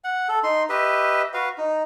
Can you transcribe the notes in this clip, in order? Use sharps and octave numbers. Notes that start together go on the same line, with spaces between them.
F#5
A4
D#4 C6
G4 B4 D#5 E5
F#4 B4 F5
D#4